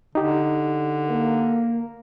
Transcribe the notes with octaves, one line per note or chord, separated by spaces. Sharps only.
D3 D#4 G4
A#3